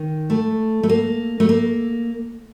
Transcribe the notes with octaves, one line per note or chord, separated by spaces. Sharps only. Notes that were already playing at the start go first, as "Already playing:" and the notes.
Already playing: D#3
A3
A3
A#3
A3
A#3